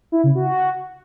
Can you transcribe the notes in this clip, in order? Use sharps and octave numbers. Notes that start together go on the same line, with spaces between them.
E4
C#3
F#4